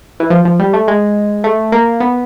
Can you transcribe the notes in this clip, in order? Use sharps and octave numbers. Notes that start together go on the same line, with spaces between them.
E3
F3
F3
G3
A3
G#3
A3
A#3
B3